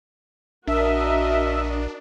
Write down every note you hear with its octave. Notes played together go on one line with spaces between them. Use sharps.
A#1 D4 F#4 A#4 D#5 E5